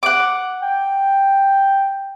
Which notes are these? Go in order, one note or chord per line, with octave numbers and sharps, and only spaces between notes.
F#5 D6
G5